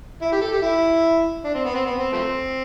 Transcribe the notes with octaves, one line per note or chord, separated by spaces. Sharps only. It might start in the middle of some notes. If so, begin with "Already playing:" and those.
E4
G4
A4
G4
E4
D4
C4
B3
C4
B3
C4
F3 A3 C4